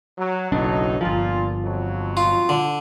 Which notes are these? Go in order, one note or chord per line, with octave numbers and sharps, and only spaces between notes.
F#3
F#1 B1 A2 F#3 D4 D#4
G1 A#2 F3 F4
F2 F#3
F4
D3